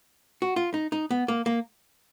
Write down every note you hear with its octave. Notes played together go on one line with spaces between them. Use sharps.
F#4
F4
D#4
D#4
B3
A#3
A#3